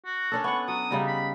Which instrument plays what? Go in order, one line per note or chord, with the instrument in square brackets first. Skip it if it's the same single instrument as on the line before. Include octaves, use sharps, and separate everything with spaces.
[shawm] F#4
[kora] C#4 D4 A4
[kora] B3 F#5 [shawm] C#6
[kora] F#3 [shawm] D#6
[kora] C#3 G3 D#4
[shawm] B5